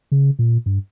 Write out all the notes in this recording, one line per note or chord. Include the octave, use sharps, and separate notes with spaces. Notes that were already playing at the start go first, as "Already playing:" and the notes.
C#3
A#2
G2